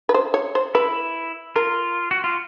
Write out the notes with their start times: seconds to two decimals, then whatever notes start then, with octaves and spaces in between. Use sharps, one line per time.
0.09 B4
0.14 C5
0.34 C#5
0.55 C5
0.75 E4 B4
1.56 F4 A#4
2.11 F#4
2.24 F4